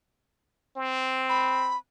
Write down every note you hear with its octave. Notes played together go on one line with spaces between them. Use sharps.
C4
B5